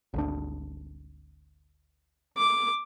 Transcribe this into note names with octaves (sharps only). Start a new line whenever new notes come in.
G#1 D2 D4
D6